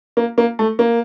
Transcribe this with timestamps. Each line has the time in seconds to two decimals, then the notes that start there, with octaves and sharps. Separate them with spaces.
0.17 A#3
0.38 A#3
0.59 A3
0.79 A#3